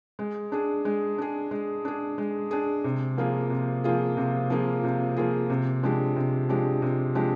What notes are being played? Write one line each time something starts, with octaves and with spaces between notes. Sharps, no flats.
G#3
D4 G#4
G#3
D4 G#4
G#3
D4 G#4
G#3
D4 G#4
C3
F3 A#3 F4 G#4
C3
F3 A#3 F4 G#4
C3
F3 A#3 F4 G#4
C3
F3 A#3 F4 G#4
C3
F3 G#3 D4 G4
C3
F3 G#3 D4 G4
C3
F3 G#3 D4 G4